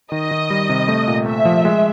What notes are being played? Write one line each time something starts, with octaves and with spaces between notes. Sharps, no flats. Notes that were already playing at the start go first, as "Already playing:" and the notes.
D#3 D#5
D#3
G3
C3
A3
A#2
A3 E5
F3
G#3